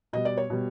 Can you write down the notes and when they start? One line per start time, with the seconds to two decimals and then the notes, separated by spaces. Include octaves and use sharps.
0.13 B2 G3 D#5
0.25 D5
0.37 C#5
0.50 B2 G3